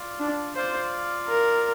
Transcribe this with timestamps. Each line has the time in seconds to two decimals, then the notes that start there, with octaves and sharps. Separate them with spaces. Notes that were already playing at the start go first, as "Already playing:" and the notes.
Already playing: F4 D5 F5
0.20 D4
0.56 F4 C5 D5 F5
1.29 A#4